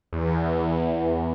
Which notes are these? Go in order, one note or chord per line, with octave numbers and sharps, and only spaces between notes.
E2